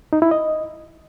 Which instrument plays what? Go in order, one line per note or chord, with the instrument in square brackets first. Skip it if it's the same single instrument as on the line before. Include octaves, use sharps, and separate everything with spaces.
[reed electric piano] D#4
E4
D#5